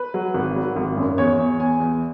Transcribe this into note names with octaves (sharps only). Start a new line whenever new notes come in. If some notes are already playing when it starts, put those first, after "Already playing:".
Already playing: B4
F#3
G#1
F#3
G#1
F#2
E2 C#5
E2
E2 G#5
E2